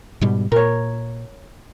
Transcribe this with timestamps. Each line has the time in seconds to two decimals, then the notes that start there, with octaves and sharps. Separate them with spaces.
0.21 G#2 B2 G3
0.52 A#2 A#4 C#5